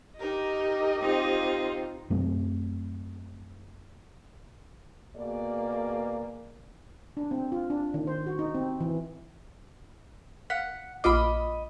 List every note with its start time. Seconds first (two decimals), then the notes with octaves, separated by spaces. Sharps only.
0.20 D#4 G4 A#4 D#5
1.02 C4 D#4 F4
2.10 F#2 F#3 A3 C4
5.16 B2 A#3 G#4 D5
7.17 D4
7.31 C4
7.52 F4
7.70 D4
7.94 D#3
8.07 C5
8.26 F#4
8.39 D#4
8.55 C4
8.81 E3
10.50 F5 F#5 B6
11.04 A#1 F4 D#5 B5 D6